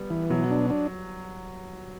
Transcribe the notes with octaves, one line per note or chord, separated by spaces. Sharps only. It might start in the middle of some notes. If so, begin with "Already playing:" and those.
Already playing: G3 B3
E3
B2 F#3
D4
D4